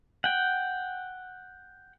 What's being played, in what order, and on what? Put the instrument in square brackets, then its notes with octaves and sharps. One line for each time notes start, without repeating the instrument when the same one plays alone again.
[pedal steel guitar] F#5 G5